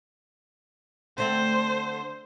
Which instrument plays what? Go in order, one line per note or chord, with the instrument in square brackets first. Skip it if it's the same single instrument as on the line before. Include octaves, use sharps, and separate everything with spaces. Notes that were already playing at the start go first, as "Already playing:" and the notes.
[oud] D3 A3 C4 [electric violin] C5